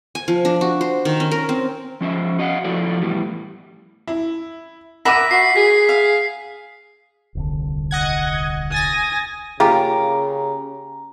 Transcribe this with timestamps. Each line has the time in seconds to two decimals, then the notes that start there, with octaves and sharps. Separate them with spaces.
0.15 G#5
0.28 F3
0.45 D4
0.61 F#4
0.81 C5
1.05 D#3
1.20 C#4
1.31 A#4
1.49 C4
2.01 F3 C#4 C5 E5
2.39 F#4 D#5 F5 F#5
2.64 F3 E4 F#4 A4 D5
3.01 A2 E3 G3 B3
4.07 E4
5.05 A#4 E5 F#5 B5 D6 B6 D#7
5.31 F#4 C7
5.56 G#4 B6
5.89 F5
7.35 D#1 C2 D3
7.91 D#5 F#5 G#6
8.72 G#5 D#6 A6 A#6
9.60 C#3 A#3 F4 G4 G#4 A#5